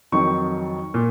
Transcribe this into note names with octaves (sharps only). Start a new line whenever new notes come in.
F2 D#3 F#3 C#6
A#2